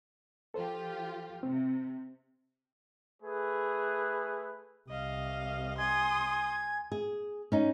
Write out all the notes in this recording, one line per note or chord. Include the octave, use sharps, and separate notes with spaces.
F3 F4 G4 A4 C5
C3 C4
A3 G#4 B4
C2 D#5 F5
G#5 C6 D#6 G#6
G#4
C#4 D#4